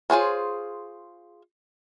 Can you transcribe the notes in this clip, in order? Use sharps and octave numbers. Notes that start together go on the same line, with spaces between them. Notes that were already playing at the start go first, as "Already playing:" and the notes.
F4 G#4 C5 C#5